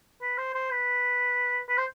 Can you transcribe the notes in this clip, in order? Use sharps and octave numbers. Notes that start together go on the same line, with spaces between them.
B4
C5
C5
B4
B4
C5